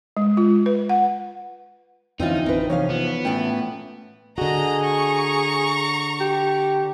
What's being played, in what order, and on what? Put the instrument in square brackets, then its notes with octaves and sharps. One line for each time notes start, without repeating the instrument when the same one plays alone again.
[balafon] G#3
F4
B4
F#5
[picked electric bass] F2 [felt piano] D3 E3 [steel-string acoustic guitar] C4 C#4 F4 [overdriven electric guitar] D#4
[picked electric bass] A1 [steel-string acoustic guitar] C4 B4
[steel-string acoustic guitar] C3 C#4 F5 [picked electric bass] E3 F3 [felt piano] C#5
[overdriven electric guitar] B3 [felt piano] F4
[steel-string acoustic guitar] A2 G5 [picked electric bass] A3 C#4
[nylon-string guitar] D3 F#4 [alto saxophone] G#4 [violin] D#5 A#5
[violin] A#5 C#6
[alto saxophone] G4